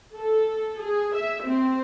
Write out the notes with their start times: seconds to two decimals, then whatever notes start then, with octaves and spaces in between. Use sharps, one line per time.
0.16 A4
0.81 G#4
1.16 E5
1.45 C4